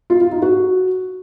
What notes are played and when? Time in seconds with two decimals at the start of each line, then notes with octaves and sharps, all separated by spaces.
0.10 F4
0.21 F4
0.31 D#4
0.42 F#4